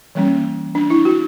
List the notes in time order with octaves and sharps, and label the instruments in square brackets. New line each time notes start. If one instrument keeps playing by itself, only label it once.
[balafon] E3 G3 A#3 C#4
D4
E4
F#4